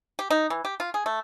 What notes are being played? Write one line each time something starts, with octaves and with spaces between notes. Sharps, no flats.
G4
D#4
E3
G4
F4
G#4
A3